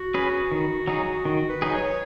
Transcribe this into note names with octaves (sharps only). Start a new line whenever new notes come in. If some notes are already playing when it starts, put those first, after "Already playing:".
Already playing: F#4
C#4 G#4 B4
D#3
F#3 D#4 G#4
D#3 F#4
B4
F#3 D#4 G#4
C#5